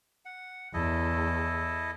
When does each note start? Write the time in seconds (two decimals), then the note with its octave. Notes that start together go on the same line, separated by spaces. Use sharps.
0.25 F#5
0.74 E2 E4 A4 D#5